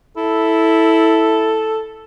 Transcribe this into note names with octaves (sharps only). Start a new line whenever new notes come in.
E4 A4